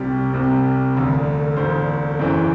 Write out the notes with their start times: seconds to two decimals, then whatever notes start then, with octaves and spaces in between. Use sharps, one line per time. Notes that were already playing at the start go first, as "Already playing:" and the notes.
Already playing: C2 C3 G3 C5
0.32 C2 C3 G3
0.95 E1 D2 D3
1.57 E1 D2 D3 C5
2.19 F#1 F#2 E3 C5